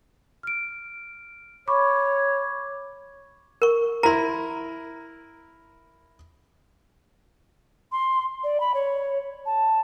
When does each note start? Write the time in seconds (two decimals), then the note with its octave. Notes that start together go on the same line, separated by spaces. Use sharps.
0.43 F6 D7
1.68 C#5 B5 C#6 D6
3.62 A#4 C#6
4.03 E4 A#4 A#5 C6
7.92 C6
8.44 D5
8.60 B5
8.74 C#5
9.46 A5